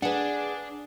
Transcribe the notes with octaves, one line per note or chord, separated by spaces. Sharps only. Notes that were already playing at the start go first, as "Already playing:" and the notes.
D4 G#4 B4 F#5